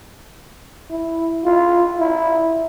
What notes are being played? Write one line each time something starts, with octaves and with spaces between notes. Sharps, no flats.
E4
F4
E4